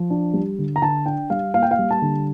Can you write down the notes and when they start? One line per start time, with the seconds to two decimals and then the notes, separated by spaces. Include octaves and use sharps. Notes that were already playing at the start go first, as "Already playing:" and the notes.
Already playing: F3
0.10 D4
0.34 G3
0.59 D3
0.76 A#5
0.82 D3 A5
1.06 D4 G5
1.30 G3 F5
1.54 A#3 F5
1.63 G5
1.71 F5
1.79 G3
1.91 A5
2.02 D3